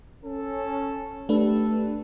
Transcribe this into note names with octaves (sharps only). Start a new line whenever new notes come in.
C#4 A4
A3 D4 G4 A4 B4